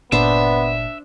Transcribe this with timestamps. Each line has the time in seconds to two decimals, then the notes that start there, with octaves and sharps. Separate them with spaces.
0.12 G1 A#2 B3 D4 C5 E5